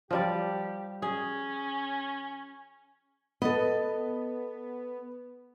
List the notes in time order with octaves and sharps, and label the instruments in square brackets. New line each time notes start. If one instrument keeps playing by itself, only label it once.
[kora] F3 G3 D5 [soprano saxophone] G4
[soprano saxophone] C#4 [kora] G#4
[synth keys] B3 [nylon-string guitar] A4 D#5